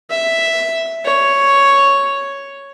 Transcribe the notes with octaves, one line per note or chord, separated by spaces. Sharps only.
E5
C#5